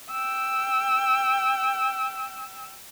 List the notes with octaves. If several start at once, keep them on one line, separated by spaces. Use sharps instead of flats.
G5 E6